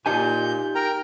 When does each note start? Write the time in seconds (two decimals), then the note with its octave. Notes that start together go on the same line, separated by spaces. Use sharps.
0.06 A#2 D#4 G4 G#5 G6
0.75 A#4 G5 A#5